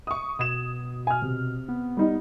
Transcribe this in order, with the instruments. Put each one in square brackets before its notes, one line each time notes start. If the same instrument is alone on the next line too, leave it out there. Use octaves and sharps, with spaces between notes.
[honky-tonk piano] C#6 D#6
[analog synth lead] B2 [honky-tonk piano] D#6 G#6 E7
[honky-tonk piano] G#5 F6
C3
[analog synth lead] B3
[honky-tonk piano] G3 D#4